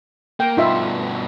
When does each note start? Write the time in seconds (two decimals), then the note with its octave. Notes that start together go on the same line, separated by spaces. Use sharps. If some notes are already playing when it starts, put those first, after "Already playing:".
0.40 A#3 G5
0.57 G2 B2 D#4 F4 E5